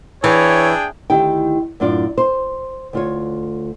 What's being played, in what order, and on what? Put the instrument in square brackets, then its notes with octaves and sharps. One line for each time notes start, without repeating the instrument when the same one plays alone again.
[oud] E3 [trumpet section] D4 G#4 G5 [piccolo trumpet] C#5
[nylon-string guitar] D2 D#3 E4 G4 G5
F#2 A2 D4 F4 D5
C5
D2 F4 C#5